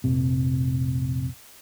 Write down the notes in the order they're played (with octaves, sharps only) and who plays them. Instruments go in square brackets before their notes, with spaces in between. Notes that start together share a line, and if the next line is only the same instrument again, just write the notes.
[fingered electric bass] F1 A#1 C3